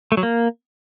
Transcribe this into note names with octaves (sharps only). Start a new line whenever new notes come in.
A3
F#3
A#3